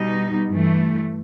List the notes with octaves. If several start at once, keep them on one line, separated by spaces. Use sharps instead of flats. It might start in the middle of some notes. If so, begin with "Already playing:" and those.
Already playing: B2 G3 D#4
G2 E3 A3